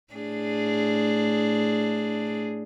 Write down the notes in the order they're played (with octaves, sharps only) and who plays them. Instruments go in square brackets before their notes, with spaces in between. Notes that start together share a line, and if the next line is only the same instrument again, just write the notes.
[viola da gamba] A2 D4 G#4